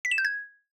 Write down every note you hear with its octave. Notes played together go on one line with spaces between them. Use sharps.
B6
E7
G6
G#6